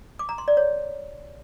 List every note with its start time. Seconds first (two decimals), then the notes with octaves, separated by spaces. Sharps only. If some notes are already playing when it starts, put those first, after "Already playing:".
0.19 D6
0.29 A#5
0.38 C6
0.48 D5
0.57 C#5